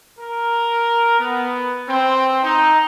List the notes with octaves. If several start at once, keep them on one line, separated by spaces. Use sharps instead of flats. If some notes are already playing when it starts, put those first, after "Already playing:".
A#4
B3
C4
D#4